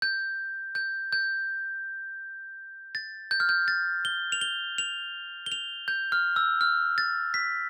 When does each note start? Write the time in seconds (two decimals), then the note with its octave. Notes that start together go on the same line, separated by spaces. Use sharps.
0.02 G6
0.75 G6
1.12 G6
2.95 A6
3.31 G6
3.40 F6
3.49 G6
3.68 A6
4.05 G7
4.32 F7
4.41 G7
4.78 F7
5.46 G7
5.52 F7
5.88 G6
6.12 F6
6.36 E6
6.61 F6
6.98 A6
7.34 B6